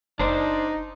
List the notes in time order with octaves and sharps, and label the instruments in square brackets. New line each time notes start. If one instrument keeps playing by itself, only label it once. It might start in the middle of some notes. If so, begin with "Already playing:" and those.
[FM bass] F#1 [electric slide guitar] D4 C5 D5 [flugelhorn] D#4